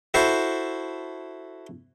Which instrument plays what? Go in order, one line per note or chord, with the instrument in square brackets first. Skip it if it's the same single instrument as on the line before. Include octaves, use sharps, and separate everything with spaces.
[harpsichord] E4 F#4 A4 C5